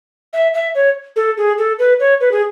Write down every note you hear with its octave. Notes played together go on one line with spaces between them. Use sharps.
E5
E5
C#5
A4
G#4
A4
B4
C#5
B4
G#4